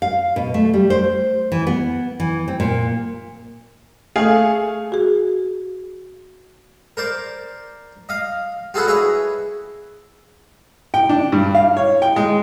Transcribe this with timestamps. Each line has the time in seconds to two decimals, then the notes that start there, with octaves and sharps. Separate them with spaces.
0.02 F5
0.36 B2
0.54 A3
0.74 G3
0.90 C5
1.52 E3
1.67 B3
2.20 E3
2.48 C4
2.60 A#2
4.16 A3 G#4 F5
4.92 F#4 G#4
6.97 A#4 C5 D5
8.09 D#5 F5
8.74 F4 F#4 G#4 A4 B4 F#5
8.87 E4 G#4 B4 C#5 D#5
10.94 G5
11.09 D4
11.32 G2
11.55 F5
11.77 C#5
12.02 G5
12.16 G#3